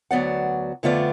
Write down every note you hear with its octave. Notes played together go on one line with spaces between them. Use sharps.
D2 F#3 B3 D5 F#5
F2 D3 A3 B3 F4 D5